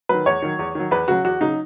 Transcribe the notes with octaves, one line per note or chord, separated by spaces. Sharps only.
D#3 F#3 B4
E2 C#5
D#3 F#3
E2
D#3 F#3
E2 B4
C#3 F#3 F#4
E2 F#4
C#3 F#3 D#4